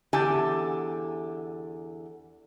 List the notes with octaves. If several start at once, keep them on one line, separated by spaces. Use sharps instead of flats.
E2 D3 G4 G#5 A5